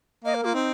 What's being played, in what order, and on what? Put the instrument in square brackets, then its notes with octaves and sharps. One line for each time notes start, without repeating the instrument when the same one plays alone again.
[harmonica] A#3 [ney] D#5
[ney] A#4
[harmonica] A#3 [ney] F4
[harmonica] C4 [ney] D#4